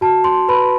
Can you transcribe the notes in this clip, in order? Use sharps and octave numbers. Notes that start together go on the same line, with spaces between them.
F#4 A5
C6
B4 B5